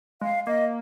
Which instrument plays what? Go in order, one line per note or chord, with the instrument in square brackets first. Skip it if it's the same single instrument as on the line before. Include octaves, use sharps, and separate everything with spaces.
[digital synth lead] G#3 [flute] F5
[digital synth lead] A#3 [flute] D#5